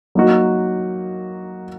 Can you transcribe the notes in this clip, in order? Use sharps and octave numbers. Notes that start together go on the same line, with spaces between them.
F#3 A#3 D#4 F#4